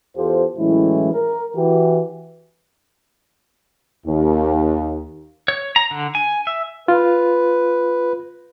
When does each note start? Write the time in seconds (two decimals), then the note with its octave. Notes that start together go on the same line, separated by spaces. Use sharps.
0.17 E2 F4 G4 A4 C5
0.58 A2 E3 F#3 G#3 C#4 E4
1.13 A#4
1.57 E3 F#4 G4
4.06 D#2
5.48 C#5
5.76 A#5
5.91 D3
6.15 G#5
6.47 E5
6.88 F4 B4